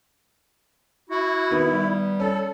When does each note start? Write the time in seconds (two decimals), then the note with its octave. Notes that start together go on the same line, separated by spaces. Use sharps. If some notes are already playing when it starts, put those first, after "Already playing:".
1.10 E4 F#4
1.51 D#3 B3
1.70 G3
2.20 C#4 A4